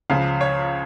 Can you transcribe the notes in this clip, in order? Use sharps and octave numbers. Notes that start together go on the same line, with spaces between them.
C#2 C#3 F3 F5
C#5